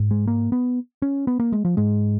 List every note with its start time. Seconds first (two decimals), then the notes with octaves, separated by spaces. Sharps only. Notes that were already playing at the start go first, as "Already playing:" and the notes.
Already playing: G#2
0.11 G#3
0.27 A#3
0.52 B3
1.02 C#4
1.27 B3
1.40 A#3
1.52 G#3
1.65 F3
1.77 G#2 G#3